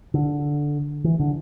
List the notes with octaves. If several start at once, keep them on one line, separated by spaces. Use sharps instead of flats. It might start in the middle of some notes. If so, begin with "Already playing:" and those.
D3
E3
D3